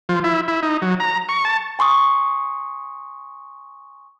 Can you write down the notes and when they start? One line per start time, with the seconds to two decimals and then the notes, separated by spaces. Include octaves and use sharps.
0.09 F3
0.24 E4
0.48 E4
0.63 D#4
0.82 F#3
1.00 A#5
1.29 C#6
1.45 A5
1.79 G#5 C6 C#6 D#6